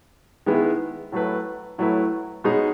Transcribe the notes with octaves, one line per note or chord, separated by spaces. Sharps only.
D#3 G#3 B3 E4 G#4
A2 F#3 A3 E4 B4
A2 F#3 A3 E4 B4
B2 G#3 D#4 G#4 C#5